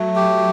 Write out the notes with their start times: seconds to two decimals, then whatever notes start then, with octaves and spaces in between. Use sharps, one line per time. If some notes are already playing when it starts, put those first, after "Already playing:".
Already playing: F#3 A3
0.16 G4